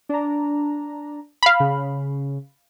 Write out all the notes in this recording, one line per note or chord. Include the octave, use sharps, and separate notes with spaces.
D4 A#5
F5 B5
C#3